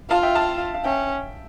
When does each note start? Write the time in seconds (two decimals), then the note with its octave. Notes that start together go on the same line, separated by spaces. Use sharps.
0.10 F4 F5 A5
0.23 E5 G5
0.35 F5 A5
0.74 F5
0.84 C#4 E5 G5